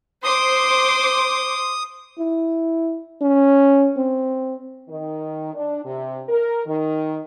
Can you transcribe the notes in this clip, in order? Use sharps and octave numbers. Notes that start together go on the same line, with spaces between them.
C5 C6 D6 D#6
E4
C#4
C4
D#3
D4
C3
A#4
D#3